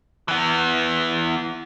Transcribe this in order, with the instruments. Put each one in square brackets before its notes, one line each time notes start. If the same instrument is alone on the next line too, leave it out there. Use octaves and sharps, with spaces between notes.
[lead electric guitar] E3 B3